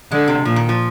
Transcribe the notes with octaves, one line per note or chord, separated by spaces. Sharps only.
D3 G#3
C3
A#2 F3
D#3
F3